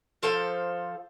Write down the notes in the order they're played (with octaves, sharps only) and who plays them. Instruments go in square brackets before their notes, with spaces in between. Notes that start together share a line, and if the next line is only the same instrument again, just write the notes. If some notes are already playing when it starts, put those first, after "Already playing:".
[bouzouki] F3 A4 C5 F5